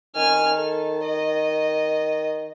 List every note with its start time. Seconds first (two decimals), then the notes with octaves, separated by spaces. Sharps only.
0.16 D#3 G#5 F6
0.53 A4
1.04 D#5